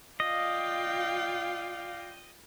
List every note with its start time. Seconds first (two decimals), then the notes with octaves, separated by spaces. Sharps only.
0.20 F4 D5 D#5 F5 G5